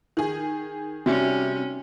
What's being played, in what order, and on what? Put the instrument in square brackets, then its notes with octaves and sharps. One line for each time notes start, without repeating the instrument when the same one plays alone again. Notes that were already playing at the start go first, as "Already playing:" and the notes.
[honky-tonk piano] D#3 G#4
[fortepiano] C3 G3 [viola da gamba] C#4 [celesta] F#4 E5